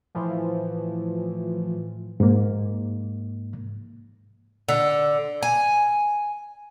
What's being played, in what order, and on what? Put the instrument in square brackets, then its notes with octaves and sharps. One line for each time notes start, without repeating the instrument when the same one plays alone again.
[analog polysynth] A2 E3 F3
[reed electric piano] G#2 A#3
[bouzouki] D3
G#5